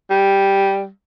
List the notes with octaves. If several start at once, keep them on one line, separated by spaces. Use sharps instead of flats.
G3